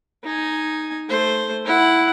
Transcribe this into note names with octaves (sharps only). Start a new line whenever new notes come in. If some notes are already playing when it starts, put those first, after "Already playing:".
D#4 G#5
A3 C5
E4 F#5